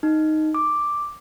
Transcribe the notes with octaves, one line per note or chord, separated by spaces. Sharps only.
D#4
D6